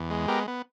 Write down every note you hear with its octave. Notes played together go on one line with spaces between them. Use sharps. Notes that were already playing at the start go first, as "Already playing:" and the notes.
Already playing: E2
G#3
B3 G4 A#4
B3